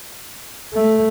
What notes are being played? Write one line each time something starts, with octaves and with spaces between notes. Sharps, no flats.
A3